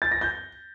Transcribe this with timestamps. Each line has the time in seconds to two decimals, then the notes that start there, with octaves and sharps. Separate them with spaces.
0.02 A6
0.12 A#6
0.21 G6